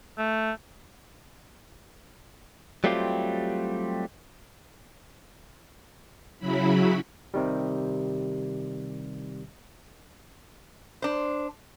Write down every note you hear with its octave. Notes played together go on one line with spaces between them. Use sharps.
A3
F#3 G3 A3 C4 F4 G4
C#3 F#3 E4 B5
C3 D#3 G3
D4 C5